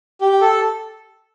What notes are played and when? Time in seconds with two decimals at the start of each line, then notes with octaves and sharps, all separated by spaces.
0.21 G4
0.41 A4